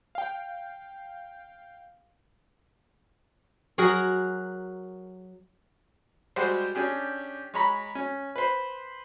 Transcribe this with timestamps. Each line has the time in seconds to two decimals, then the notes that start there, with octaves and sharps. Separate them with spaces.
0.15 F5 G5
3.78 F#3 F#4 G#4 A#4
6.36 G3 G#3 F#4 G4 C5
6.75 C#4 D4 G4 G#4
7.54 G#3 C#5 A#5 B5
7.95 C#4
8.36 B4 C5